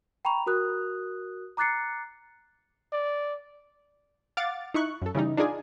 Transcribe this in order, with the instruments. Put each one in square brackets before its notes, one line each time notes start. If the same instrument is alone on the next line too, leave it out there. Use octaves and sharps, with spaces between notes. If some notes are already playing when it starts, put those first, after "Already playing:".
[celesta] G5 A#5 B5 C#6 F7
F#4 A#4 D#6 F#6
A#5 D6 F#6 A6 C7 C#7
[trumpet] D5
[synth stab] F5 F#5 D6 A6
D#4 E4 C#6 F#6
F#2 A4
C#3 E3 G3 D#4
D4 D#4 F4 G#4 D5 G#5